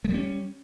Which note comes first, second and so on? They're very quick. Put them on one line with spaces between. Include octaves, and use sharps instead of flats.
G#3 G3 C#4